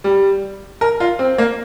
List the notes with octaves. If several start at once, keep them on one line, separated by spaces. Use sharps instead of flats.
G3
A#4
F4
C4
A#3